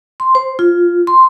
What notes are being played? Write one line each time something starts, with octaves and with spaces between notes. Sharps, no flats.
C6
C5
F4
C6